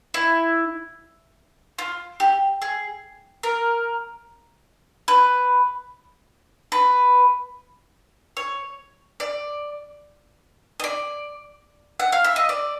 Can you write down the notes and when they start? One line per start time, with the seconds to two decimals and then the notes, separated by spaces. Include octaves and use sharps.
0.14 E4
1.79 F4
2.20 G4
2.62 G#4
3.43 A#4
5.08 B4
6.72 B4
8.37 C#5
9.20 D5
10.80 D#5
10.84 D5
12.00 F#5
12.12 F5
12.24 E5
12.36 D#5
12.49 D5